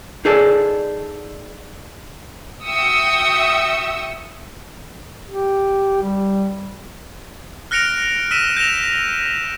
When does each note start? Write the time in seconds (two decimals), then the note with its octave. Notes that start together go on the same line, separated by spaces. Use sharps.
0.25 D#4 G#4 A4 D5
2.66 F#4 E5 G5 D#6 E6 C#7
5.28 G4
6.02 G3
7.71 F6 F#6 A#6 C#7 D7 F7
8.31 E6 F6 B6 D#7 E7
8.57 G6 A#6 E7 F7